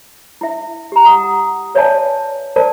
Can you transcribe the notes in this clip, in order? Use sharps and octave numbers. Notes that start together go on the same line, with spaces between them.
E4 E5
G4 A#5
F#5 D#6
B4 C#5 D5 E5 G#5 A5
A#4 C5 D5 A5